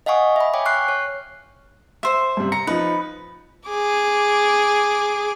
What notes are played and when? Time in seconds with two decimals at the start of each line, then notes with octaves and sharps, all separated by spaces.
0.06 D#5 F5 F#5 G#5 C#6 D#6
0.36 E5 B5
0.54 C#5 F5 G5 G#5 D6
0.66 C#6 F6 F#6 C7
0.89 C#5
2.03 C5 E5
2.37 G2 C3
2.52 A#5 C#7
2.67 F3 D#4 B4
3.69 G#4 D6